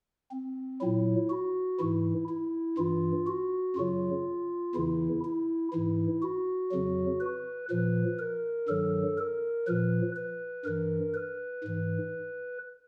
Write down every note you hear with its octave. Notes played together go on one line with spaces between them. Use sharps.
C4
A#2 F#3 E4
F#4
G#2 E3 E4
E4
G2 E3 F4
F#4
F#2 C#3 F#3 F4
E2 C#3 E3 E4
E4
G#2 E3 E4
F#4
F2 C#3 F#3
B4
A#2 F3 B4
A#4
G2 D#3 F#3 A4
A#4
A#2 F3 B4
B4
G2 E3 A#4
B4
G#2 E3